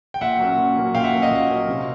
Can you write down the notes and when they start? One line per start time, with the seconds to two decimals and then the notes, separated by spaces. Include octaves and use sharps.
0.14 G5
0.21 A#2 E5 F#5
0.39 F#3 A#3 C#4
0.58 A#2
0.77 F#3 A#3 C#4
0.95 A#2 F5 G5
1.04 E5 F#5
1.13 F#3 A#3 C#4
1.22 D#5 F5
1.31 A#2
1.50 F#3 A#3 C#4
1.68 C3